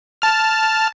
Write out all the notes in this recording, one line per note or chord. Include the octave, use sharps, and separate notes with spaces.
A5 F6